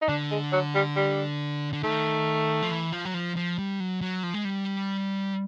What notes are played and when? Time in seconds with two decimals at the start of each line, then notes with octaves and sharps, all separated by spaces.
0.02 D#4
0.09 D3 D4
0.31 G#3
0.52 F#3
0.75 G3
0.96 G3
1.73 D3
1.83 D#3 A3
2.62 F3
2.71 E3
2.92 F3
3.05 F#3
3.14 F3
3.36 F3
3.58 G3
3.80 F#3
4.01 F#3
4.23 F3
4.34 G#3
4.45 G3